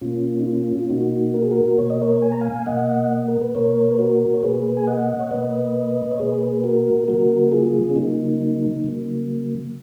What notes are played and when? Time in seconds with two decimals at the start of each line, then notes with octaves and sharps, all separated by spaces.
0.01 B2 A#3 C#4 F4
0.40 D#4
0.46 C#4 F4
0.79 F4
0.90 B2 A#3 D#4 F#4
1.34 A#4
1.43 G#4
1.51 F#4 A#4
1.78 B2 A#3 C#5
1.90 D#5
2.02 A#4 C#5
2.22 G#5
2.32 A#5
2.41 F5 G#5
2.66 B2 A#3 D#5 F#5
3.28 A#4
3.41 B4
3.55 B2 A#3 A#4 C#5
3.91 B4
3.99 F#4 A#4
4.34 C#5
4.43 B2 A#3 G#4 B4
4.77 G#5
4.87 D#5 F#5
5.19 C#5
5.31 B2 A#3 B4 D#5
6.11 C#5
6.19 B2 A#3 G#4 B4
6.54 B4
6.64 F#4 A#4
7.08 C#3 F#3 A#3 F#4 A#4
7.48 A#4
7.51 F4 G#4
7.90 C#4
7.96 C#3 F#3 A#3 D#4
8.84 C#3 F#3 A#3